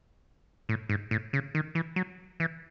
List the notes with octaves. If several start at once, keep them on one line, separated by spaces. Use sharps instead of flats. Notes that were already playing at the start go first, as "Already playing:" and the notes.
A2
G#2
A2
C#3
D#3
E3
F#3
E3